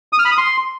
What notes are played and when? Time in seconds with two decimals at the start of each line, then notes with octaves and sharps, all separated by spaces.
0.13 D#6
0.19 F6
0.25 B5
0.31 D#6
0.38 C6